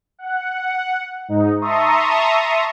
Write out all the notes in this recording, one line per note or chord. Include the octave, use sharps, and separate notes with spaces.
F#5
G#2 D#4
E5 A5 A#5 C6 C#6 D#6